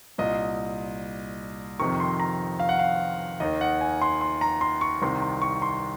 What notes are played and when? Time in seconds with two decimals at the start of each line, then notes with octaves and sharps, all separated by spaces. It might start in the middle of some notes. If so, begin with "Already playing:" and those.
0.18 C2 A#2 D#5
1.79 F2 C3 D#3 C#6
2.00 C6
2.20 A#5
2.60 F5
2.69 F#5
2.79 F5
3.40 D#2 D#3 D#5
3.61 F#5
3.81 G#5
4.02 C6
4.21 C6
4.41 A#5
4.61 C6
4.81 C#6
5.02 C2 C3 D#3 C6
5.22 C6
5.42 C#6
5.62 C6